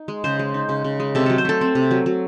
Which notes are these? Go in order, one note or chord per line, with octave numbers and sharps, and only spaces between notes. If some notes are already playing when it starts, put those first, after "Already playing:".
Already playing: D#4
G#3
C#3 C5
G#3
D#4
C#3
C#3
G#3
C3 A4
F#3 A4
C5
A3 A4
C4
C3
F#3
F#3